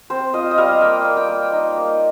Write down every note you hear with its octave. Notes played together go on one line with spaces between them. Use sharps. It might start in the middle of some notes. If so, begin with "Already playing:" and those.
C4 C5
F4 D#5
D#5
G3 F5
A#3 G5
A#3
G5
A#3
D#4
A#3